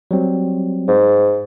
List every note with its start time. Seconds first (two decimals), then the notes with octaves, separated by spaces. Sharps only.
0.11 F#3 G3 C4
0.88 G#2